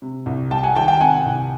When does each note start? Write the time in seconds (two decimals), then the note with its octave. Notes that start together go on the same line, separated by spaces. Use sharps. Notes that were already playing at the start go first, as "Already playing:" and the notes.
0.02 C3
0.26 C2
0.51 G3 G5 A5
0.63 F#5 G#5
0.75 D#3 G5 A5
0.88 G5 A5
1.00 C3 F#5 G#5
1.26 C2